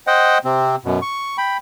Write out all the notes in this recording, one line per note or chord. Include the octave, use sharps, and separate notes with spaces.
C5 D#5 F#5 G5
C3 C4
F#2 B2
C#6
G5 B5